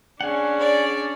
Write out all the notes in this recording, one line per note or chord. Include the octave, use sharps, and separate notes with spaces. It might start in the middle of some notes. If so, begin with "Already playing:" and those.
C#4 D4 G#4 F#5
C#5 D5